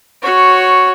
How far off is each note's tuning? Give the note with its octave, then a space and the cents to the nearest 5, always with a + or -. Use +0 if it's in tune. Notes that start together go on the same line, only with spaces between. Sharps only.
F#4 +0 C#5 +0